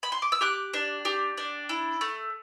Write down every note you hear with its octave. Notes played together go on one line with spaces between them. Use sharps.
B5
C6
D6
E6
G4 D6 F#6
D4
G4
D4
E4
A3